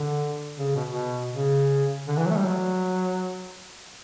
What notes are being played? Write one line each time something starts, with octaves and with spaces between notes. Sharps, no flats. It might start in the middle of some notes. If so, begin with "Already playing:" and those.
Already playing: D3
C#3
B2
B2
C#3
D3
E3
F#3
A3
G3
F#3